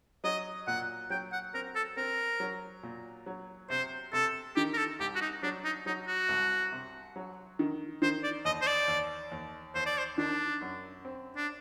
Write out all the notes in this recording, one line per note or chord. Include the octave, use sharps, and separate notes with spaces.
F#3 D#5
A#2 F#5
F#3 G5
F#5
C4 A#4
A4
C4 A#4
F#3
A#2
F#3
C3 C5
C3 A4
D#3 G4
A#4
A4
C2 G4
F#4
D#4
F#3 D4
D#4
F#3 D#4
F#4
C2
C3
F#3
D#3
D#3 C5
D5
D#2 D#5
C5
D5
D#2
D#2
D#2 C5
D5
C5
D#3 D4
F#2
C4
D4